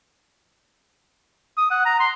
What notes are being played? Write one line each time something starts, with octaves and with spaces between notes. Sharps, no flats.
D#6
F#5
A#5
C6